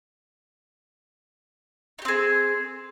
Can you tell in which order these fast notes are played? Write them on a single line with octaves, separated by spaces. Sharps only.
D#4 G4 C4 G#4